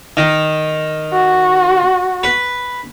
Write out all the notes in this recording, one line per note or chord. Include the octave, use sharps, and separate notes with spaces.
D#3
F#4
B4